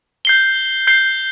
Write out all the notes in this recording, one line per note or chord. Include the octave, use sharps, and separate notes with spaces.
G6 C7 G7
G6 C7 G7